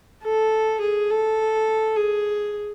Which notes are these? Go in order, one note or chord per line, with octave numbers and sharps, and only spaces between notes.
A4
G#4
A4
G#4